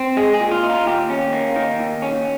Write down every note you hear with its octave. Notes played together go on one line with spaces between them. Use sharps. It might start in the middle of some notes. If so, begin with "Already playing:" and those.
Already playing: C4
G#3 G#4
G#4
A#2
F4
D#4
F4
D#2 G4
C#4
A#3
D#3
D#2
C#4